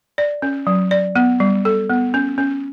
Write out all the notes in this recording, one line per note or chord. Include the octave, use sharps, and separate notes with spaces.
D5
C#4
F#3
D5
B3
G3
A4
B3
C#4
C#4